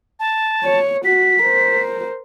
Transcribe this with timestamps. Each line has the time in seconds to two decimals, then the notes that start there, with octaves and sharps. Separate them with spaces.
0.20 A5
0.63 C#5
1.05 F#4 B6
1.43 A#4 C5